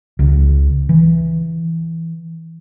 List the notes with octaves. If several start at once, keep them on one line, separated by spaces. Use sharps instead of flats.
C#2
E3